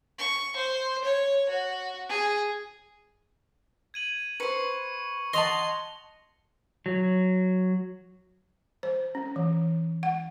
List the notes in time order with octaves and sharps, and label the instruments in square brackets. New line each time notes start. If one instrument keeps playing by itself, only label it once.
[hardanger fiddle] C#6
C5
C#5
F#4
G#4
[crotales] G#6 D#7 F#7
[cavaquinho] B4 C5 [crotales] C#6 C#7
[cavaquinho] D#5 F#5 A5 [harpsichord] C6 [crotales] A#6 F7 F#7
[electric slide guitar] F#3
[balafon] C5
C#4
E3
F#5